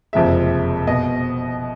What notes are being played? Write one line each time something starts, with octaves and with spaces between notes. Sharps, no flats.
F#1 F2 C3 F3 G#3 E5
B2 D#5